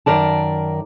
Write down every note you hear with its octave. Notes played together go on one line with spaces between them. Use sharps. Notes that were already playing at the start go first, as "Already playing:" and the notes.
F#2 D#3 A#4 D5 A5